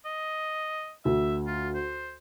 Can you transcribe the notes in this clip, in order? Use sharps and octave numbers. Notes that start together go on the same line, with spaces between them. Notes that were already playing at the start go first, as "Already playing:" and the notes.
D#5
D2 E5
F4
C5